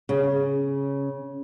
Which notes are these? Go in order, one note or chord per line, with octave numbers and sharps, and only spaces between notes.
C#3